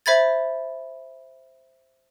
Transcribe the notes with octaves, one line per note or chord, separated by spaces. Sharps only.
C5 E5 B5 G#6 A6